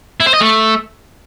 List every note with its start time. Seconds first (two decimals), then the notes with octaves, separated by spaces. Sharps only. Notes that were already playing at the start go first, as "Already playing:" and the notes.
0.20 E4
0.27 C5
0.34 D#5
0.41 A3